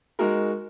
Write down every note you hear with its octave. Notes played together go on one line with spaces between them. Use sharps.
G#3 D#4 F#4 A#4